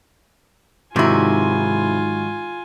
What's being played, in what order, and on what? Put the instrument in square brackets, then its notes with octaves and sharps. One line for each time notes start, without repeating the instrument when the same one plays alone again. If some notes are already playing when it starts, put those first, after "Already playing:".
[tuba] G#2 [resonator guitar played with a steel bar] C3 E4 [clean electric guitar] D#3 F#3 [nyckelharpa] F4 G#5